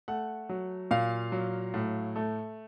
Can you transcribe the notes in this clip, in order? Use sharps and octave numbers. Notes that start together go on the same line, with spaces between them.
A3 F#5
F#3
A#2 F5
F#3
A2
A3